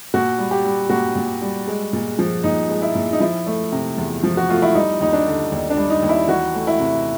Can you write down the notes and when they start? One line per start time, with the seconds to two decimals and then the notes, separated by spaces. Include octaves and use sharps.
0.14 A#2 F#4
0.38 G3
0.51 G4
0.65 G3
0.90 A#2 F#4
1.16 A#2
1.41 G3
1.68 G#3
1.93 A#2
2.19 F3
2.44 A#2 D#4
2.70 G#3
2.82 E4
2.95 A#2
3.12 D#4
3.20 F3 E4
3.46 A3
3.72 C3
3.98 E2
4.23 F3
4.37 F#4
4.49 A3 F4
4.62 E4
4.75 G3 D#4
5.00 D#2 D#4
5.13 D4
5.26 D3
5.52 D#2
5.70 D4
5.77 G3
5.90 D#4
6.03 D#2
6.09 E4
6.28 E3 F#4
6.54 A3
6.67 E4
6.79 C3